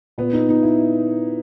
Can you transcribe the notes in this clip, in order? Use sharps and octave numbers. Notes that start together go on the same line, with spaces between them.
A#2 B3
D#4
D#4
E4